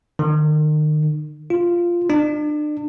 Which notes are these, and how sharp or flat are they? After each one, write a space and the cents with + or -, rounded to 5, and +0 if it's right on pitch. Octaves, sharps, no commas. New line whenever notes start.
D#3 -35
F4 -5
D4 +35